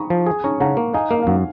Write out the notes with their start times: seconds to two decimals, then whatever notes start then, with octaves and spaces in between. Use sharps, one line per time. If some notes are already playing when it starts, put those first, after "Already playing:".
Already playing: A#5 B5 C#6 D#6
0.10 F3
0.27 G#4
0.44 C#4 A#5 C#6
0.60 C#3 F#5 A#5
0.77 A#3
0.93 D#4 F5 G#5
1.11 A#3 F5
1.22 F5
1.27 F#2 F#5